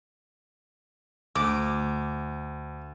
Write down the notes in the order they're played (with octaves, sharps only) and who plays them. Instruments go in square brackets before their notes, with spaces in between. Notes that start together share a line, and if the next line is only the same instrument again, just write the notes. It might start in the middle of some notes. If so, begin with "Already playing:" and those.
[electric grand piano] D2 [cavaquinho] D6